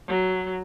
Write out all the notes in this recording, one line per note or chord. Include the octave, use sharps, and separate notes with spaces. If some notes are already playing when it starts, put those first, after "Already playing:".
F#3